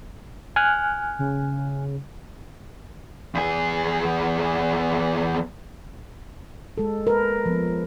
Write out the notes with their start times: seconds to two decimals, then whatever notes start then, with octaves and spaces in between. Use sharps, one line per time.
0.56 G#5 F6 F#6
1.19 C#3
3.35 E2 G#4
6.78 G#3 A4
7.07 A#4 B4
7.46 F3 B3